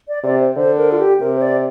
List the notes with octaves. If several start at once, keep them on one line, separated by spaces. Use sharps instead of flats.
D5
C3 D5
C5
D3 C5
A#4
F4
G4
C3 A#4
C5
D5